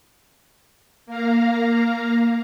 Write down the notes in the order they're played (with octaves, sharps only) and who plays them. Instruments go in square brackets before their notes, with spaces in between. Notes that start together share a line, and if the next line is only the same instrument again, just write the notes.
[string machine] A#3 F5 A#5